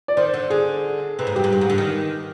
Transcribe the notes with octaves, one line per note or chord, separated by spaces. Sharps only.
D5
D#3 C5
D3
D3 G#4
C3 B4
G#2
G2 G4
G#2
G2
G#2
D3
D#3